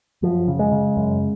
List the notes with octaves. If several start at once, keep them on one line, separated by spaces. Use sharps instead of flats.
F#2 F3
C#3
G#3
C#3
F#2